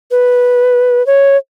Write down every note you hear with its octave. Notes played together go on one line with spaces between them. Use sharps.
B4
C#5